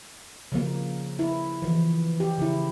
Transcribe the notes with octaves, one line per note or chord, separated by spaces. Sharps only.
C#3 F3 A#3
E4
E3 F3
G4
C#3 E4